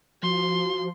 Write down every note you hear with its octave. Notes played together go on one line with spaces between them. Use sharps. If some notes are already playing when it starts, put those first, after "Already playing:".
F3 F#4 C6